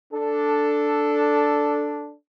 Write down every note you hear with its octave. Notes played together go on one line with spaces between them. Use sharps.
D4 A4